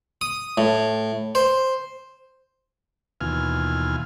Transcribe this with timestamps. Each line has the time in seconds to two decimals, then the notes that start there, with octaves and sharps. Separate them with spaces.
0.21 D#6
0.58 A2
1.35 C5
3.21 D#2 B2 E3 F4 G#5 F6